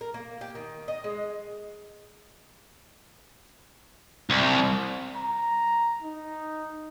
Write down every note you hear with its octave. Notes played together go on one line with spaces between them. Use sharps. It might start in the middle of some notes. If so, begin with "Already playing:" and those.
A#4
A#3
G4
D#3
D#5
G#3
C2
A#5
D#4